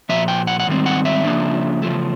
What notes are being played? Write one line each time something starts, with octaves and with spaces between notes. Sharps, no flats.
A#2 F3 E5
G5
F#5
F#5
G#2 D#3 G3 C4
F#5
E5
C#3 F3 A#3 D4
E2 C#3 F3 A3